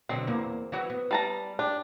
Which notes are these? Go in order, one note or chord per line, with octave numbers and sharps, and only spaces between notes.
B2 D3 F#3 C4
E2 A#3
E3 F#3 F#4
B3
G3 A5 A#5
D4 G4